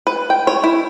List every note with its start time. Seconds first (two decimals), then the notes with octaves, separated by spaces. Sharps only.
0.07 B4
0.30 G5
0.47 C#5
0.64 E4